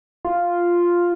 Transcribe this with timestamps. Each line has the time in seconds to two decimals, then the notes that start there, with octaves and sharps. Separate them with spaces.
0.25 F4